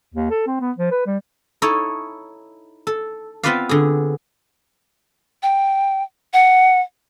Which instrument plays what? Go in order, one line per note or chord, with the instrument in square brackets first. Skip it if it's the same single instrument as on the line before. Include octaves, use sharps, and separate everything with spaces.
[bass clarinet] D#2
A4
C4
B3
F3
B4
G3
[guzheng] D#4 E4 A4 C#5
A4
B3 C4 F4 B4 D5 F5
D3 G#4
[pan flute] G5
F#5